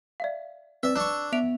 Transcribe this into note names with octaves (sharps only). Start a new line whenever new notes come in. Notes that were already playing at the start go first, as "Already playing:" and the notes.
D5 E5 F5
C4 B4 D5 E5
D4 C#6 E6
B3 E5 D7 F7